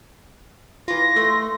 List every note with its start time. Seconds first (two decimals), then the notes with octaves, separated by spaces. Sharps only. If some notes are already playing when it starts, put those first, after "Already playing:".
0.88 E3 F4 A#6
1.16 A3 C6